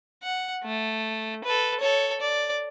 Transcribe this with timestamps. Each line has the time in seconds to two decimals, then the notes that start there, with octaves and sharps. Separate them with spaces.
0.23 F#5
0.64 A3
1.44 A4 B4
1.80 A4 C#5
2.21 D5